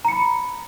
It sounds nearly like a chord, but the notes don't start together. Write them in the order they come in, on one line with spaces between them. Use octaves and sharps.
A#5 C#7 B5